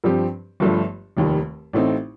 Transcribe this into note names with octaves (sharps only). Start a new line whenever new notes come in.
G2 F3 C4 G4
G1 G2 F3 A3
F1 D#2 D#3 G3
A1 A2 A3 C4 D#4